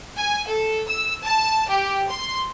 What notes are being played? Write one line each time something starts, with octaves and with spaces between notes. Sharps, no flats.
G#5
A4
E6
A5
G4
C6